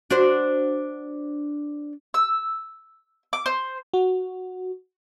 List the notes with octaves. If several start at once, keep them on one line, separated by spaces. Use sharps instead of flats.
D4 F#4 C5
E6
D6
C5
F#4